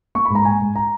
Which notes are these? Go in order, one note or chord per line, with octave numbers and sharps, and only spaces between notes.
A#3 C#6
B5
G#2
A#5
G#2 G#5
G#2
A#5